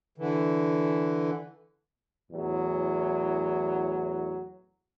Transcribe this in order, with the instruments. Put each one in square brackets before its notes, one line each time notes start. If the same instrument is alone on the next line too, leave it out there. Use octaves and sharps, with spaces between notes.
[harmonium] D3 E3
[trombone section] E2 A2 F#3